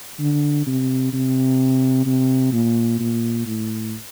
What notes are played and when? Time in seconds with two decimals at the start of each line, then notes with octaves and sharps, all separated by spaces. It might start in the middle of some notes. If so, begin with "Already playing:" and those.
0.20 D3
0.67 C3
1.13 C3
2.06 C3
2.52 A#2
3.00 A#2
3.46 A2